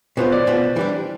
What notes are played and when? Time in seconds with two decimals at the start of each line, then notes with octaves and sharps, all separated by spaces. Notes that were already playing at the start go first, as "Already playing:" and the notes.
0.17 B2 B3 F4 C5
0.32 D5
0.47 B2 B3 F4
0.76 E3 G3 D4